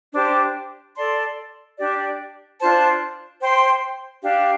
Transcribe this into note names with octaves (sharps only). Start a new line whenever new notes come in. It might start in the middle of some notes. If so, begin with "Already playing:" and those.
D4 G4 C5
A4 D5 A5 C6
D4 G4 D5
D4 F4 C5 A5
C5 G5 C6
D4 G4 F5